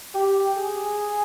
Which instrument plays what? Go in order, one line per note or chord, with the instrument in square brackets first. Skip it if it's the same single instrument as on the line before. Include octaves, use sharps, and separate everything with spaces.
[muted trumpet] G4
G#4